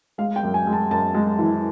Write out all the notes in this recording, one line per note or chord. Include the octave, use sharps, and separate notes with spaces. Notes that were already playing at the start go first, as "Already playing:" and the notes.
G#3 F5
G5
F#2
G#5
G#3
A5
F#2 A5
G#3
E3